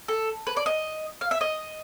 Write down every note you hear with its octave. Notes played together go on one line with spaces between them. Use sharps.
A4
B4
D5
D#5
F5
E5
D#5